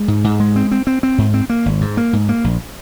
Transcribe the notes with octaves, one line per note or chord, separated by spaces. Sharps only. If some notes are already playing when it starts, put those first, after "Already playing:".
Already playing: G#3
G#2
G#2
G#3
C4
C4
C4
C4
G#2
C4
A#3
G#1
G#2
A#3
G#2
A#3
A#1